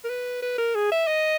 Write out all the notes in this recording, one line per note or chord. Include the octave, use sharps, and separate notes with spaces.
A#4
B4
B4
A#4
G#4
E5
D#5